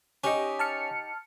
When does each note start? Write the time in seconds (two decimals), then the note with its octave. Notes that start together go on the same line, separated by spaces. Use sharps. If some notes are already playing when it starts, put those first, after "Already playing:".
0.24 C#4 D#4 G4
0.59 A5 F6 C#7